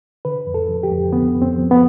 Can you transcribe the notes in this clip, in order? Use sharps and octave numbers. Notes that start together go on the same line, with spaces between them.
D3 B4
F2
A4
F3
G4
F2
D3 B3
F2
C4
F3
B3